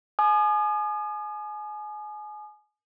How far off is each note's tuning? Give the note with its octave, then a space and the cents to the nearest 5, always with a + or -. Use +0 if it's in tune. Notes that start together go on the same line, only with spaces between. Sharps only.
G#5 +30 D#6 -40